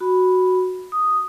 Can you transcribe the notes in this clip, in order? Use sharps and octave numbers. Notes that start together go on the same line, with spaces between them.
F#4 B5
D#6